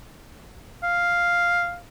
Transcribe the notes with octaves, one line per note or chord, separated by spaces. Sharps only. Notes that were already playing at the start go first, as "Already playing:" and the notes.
F5